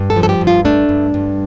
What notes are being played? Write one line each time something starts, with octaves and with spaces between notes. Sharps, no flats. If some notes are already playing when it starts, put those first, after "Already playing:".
Already playing: G2
A4
F3
A4
G4
G2
F4
A3 D4
G2
G2